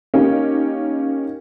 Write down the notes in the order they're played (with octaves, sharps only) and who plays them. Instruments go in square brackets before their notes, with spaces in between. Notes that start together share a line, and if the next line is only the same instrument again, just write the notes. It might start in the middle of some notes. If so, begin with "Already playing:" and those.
[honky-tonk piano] A#3 C#4 D#4 G4